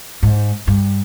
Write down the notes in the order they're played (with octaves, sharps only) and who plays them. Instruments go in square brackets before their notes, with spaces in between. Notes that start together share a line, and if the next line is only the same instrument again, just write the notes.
[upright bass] G#2
G2